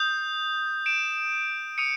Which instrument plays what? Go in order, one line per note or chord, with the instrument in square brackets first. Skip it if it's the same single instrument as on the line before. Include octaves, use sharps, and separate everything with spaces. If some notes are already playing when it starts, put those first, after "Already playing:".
Already playing: [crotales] D#6 G6
D7 E7
D#6 C#7 D#7